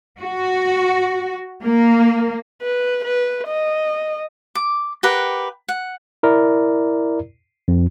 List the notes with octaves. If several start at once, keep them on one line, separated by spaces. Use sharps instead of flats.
F#4
A#3
B4
B4
D#5
D6
G4 A#4 B4 F#5
F#5
E4 A#4 D5
F2